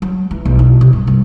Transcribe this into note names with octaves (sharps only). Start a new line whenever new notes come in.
F#3
E3
B1
E4
C3
G2
G2